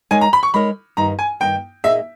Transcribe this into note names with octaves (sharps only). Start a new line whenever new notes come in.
G#3 D#4 A#4 C#5 G#5
A#5
B5
C#6
G#3 D#4 A#4 C#5 B5
G2 D#3 A#3 D#4 A#5
G#5
G2 D#3 A#3 D#4 G5
A#2 A#3 D#4 G#4 D#5 E5